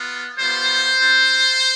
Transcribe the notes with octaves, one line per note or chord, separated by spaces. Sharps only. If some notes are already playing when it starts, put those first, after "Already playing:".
Already playing: B3 F4
G3 B3 F4 C5
C4 F4